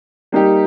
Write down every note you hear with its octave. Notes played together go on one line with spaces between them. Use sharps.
G3 A#3 D#4 G4